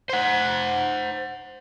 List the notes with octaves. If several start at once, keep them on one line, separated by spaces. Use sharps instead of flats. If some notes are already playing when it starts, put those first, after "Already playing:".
C5 F#5